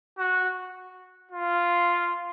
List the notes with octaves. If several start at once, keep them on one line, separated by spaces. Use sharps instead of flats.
F#4
F4